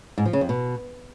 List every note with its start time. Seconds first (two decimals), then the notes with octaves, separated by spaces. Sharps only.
0.18 G#2
0.25 F3
0.33 C#3
0.41 F2
0.49 B2